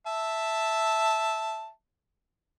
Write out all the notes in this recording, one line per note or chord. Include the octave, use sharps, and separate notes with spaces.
E5 A5